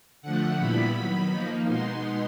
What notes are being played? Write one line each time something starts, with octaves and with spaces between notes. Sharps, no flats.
D3 F3 A3 F#5
A#2 G3 B3 E4 B5
D#3 F#3 B3
F3 A#3 D#4
B2 G#3 B3 D#4 C6